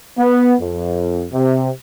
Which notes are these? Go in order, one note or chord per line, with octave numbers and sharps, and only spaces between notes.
B3
F2
C3